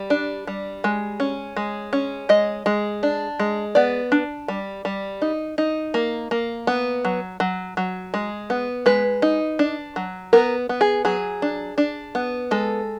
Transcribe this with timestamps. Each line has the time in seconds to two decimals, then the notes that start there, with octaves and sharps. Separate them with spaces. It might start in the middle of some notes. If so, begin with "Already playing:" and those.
Already playing: G3
0.10 D4
0.47 G3
0.84 G#3
1.20 C#4
1.56 G#3
1.93 C#4
2.29 G#3 D#5
2.66 G#3
3.03 D4
3.39 G#3
3.75 B3 D5
4.12 D4
4.48 G3
4.85 G3
5.22 D#4
5.58 D#4
5.94 A#3
6.31 A#3
6.67 B3
7.05 F#3
7.40 F#3
7.77 F#3
8.14 G#3
8.50 B3
8.86 G#3 B4
9.22 D#4
9.59 D4
9.96 F#3
10.33 B3 A#4
10.69 B3
10.81 G#4
11.05 F#3 G#4
11.42 D4
11.78 D4
12.15 B3
12.51 G#3 A4